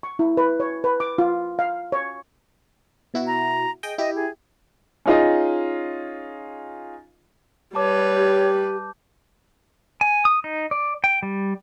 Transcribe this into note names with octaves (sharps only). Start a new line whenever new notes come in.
C#6
E4
B4
C#5
B4
D6
F4
F5
C#5
B2 E4 F#4
A#5
G#4 D#5 G5
E4 G4 D#5
G#4
C#4 D#4 F4 G#4 D#5
G3 B4 C#5 A5 D6
G4 G6
G#5
D#6
D#4
D5
G5
G3